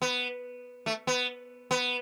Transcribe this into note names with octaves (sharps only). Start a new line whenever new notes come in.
B3
A3
B3
B3